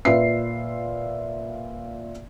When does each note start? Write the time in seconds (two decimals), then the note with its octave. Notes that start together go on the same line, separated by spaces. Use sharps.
0.05 A#2 F4 B4 E5 C7